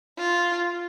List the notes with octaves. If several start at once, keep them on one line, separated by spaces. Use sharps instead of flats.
F4